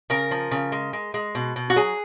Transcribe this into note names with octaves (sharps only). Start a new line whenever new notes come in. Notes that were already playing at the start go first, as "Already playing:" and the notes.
C#3 A#4
F3
C#3
G#3
G#3
G#3
B2
B2
F#4
F#3 G#4